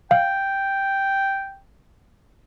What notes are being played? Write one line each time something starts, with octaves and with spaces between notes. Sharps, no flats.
F5 G5